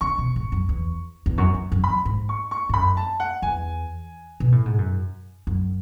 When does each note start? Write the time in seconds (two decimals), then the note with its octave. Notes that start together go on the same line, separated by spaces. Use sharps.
0.01 C#3 C#6
0.18 B2
0.36 G#2
0.52 F#2
0.69 E2
1.26 E2
1.38 F#2 C#6
1.54 E2
1.72 F#2
1.84 F#2 B5
2.05 G#2
2.29 C#6
2.51 C#6
2.69 G#2
2.74 F#2 B5
2.97 A5
3.20 F#5
3.42 E2 G#5
4.40 B2
4.52 A2
4.66 G#2
4.78 F#2
5.47 F#2